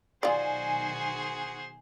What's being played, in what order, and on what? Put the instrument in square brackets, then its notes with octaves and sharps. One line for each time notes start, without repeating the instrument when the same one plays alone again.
[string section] B1 D#3 G#5 [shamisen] F4 D5 [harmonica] F#4 G#4 C5